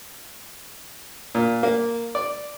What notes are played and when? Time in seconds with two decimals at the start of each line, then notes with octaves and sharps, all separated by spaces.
1.35 A#2
1.63 A#3
2.15 D5